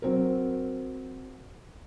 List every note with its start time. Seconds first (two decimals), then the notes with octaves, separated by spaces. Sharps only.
0.02 F#3 C4 A#4